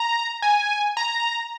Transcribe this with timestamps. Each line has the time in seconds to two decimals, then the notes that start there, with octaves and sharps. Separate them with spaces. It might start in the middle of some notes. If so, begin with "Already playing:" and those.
Already playing: A#5
0.42 G#5
0.97 A#5